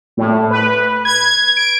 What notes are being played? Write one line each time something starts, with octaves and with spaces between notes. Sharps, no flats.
A2
B4
G#6
D7